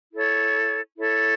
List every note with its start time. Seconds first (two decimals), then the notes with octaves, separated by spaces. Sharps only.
0.12 E4 A4 C#5
0.97 E4 A4 C#5